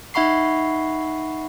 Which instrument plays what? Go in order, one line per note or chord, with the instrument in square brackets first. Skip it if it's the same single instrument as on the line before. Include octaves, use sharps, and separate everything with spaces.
[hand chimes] D#4 E5 F#5 B5 C#6 C7